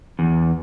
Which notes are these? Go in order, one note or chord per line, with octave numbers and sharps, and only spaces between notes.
E2